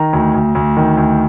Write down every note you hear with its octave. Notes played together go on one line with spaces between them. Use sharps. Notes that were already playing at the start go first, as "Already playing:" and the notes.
Already playing: D#3 A#5
D2
D2
D2
D#3
D2